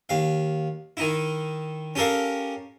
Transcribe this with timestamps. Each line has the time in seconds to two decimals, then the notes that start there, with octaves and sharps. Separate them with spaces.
0.09 D#2 F5
0.97 D#3 D#4 E4
1.96 C#4 G4 A4 A#4 F5